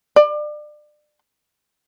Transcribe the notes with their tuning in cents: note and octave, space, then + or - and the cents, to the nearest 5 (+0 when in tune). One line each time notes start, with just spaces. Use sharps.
D5 +30